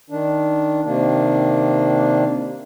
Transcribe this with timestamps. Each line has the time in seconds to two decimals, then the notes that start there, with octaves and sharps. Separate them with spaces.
0.10 D#3 D4
0.85 C3 D#3 A#3 D4